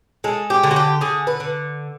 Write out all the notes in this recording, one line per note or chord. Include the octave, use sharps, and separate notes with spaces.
G#3 A4
G4
D3
F#4
G4
D3 G#4
B4
D3